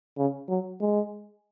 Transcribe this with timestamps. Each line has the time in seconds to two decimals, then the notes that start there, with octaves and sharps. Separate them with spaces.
0.18 C#3
0.49 F#3
0.81 G#3